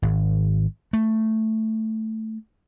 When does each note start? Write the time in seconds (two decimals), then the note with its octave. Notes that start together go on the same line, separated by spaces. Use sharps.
0.02 G#1
0.93 A3